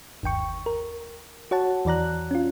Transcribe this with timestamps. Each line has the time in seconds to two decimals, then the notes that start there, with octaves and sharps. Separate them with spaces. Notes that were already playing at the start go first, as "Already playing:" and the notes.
0.23 G1 D#2 G5 C#6
0.66 A#4
1.51 F#4 C#5 F#5 A5
1.85 E2 E3 D5 A#5 F#6
2.31 C#4 F4